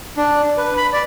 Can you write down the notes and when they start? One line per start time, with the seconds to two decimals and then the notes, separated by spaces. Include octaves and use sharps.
0.17 D4
0.57 B4
0.77 B5
0.93 D5